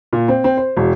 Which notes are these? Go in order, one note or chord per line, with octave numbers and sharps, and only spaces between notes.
A#2
C4
C4
C5
E1